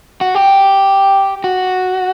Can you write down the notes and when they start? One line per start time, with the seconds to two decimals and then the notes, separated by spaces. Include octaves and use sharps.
0.21 F#4
0.35 G4
1.44 F#4